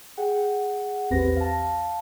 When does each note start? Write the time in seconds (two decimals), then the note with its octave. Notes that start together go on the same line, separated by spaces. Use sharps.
0.17 G#4 F#5 G5
1.10 A#1 E2 C4 G4 B4 A#6
1.36 F5 A5